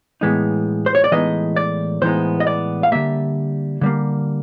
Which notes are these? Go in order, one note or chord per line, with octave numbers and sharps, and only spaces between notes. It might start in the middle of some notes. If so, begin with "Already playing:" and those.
A2 E3 G#3 B3 D#4
C5
C#5
D5
A2 E3 G#3 B3 D#4 D#5
D5
A2 E3 G#3 B3 D#4 C5
D#5
D5
F5
D3 G3 A#3 E5
D3 G3 A#3